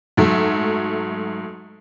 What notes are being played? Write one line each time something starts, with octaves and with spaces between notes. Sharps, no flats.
G#2 F#3 A3